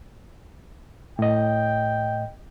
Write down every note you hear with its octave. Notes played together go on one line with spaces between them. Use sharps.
A2 D#5 G5